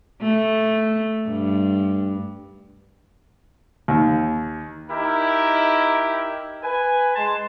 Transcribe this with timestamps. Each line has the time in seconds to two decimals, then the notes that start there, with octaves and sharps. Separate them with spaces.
0.22 A3
1.29 G2
3.88 D#2
4.91 D#4 E4 G4 A#4
6.63 B4 G#5
7.16 G#3 A5 C6